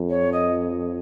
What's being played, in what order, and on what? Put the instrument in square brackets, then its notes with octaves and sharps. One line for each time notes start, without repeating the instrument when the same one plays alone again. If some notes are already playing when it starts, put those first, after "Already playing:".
Already playing: [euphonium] F2
[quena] C#5
D#5